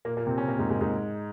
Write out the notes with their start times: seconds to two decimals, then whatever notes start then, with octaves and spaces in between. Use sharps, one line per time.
0.05 A#2 A#3
0.17 A#2 A#3
0.27 C3 C4
0.38 C#3 C#4
0.48 A#2 A#3
0.59 G#2 G#3
0.70 G#2 G#3
0.81 G#2 G#3